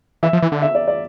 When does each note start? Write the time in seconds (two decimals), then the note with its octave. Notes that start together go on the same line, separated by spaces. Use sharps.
0.23 E3 E5
0.33 F3
0.42 E3
0.52 D3
0.62 E5
0.75 D5
0.88 D5